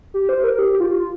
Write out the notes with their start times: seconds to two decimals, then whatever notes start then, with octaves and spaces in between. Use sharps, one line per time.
0.14 G4
0.29 C5
0.44 A#4
0.59 G4
0.73 G4
0.80 F4